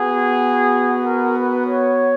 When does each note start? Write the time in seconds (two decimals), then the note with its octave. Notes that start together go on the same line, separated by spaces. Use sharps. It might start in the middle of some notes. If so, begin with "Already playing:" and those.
Already playing: B3 F#4 G#4
1.03 A#4
1.35 B4
1.65 C#5